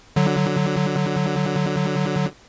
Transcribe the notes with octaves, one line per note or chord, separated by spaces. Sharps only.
D3 F#3